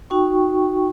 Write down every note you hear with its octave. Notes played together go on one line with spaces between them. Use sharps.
D#4 F#4 G5 C#6